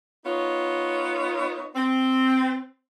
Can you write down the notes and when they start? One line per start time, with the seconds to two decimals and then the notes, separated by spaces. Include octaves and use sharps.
0.25 B3 D#4 F4 C#5
1.75 C4